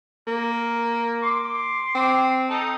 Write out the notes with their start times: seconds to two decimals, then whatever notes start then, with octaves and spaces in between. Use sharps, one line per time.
0.27 A#3
1.23 C6 D6
1.95 C4
2.50 D#4 A4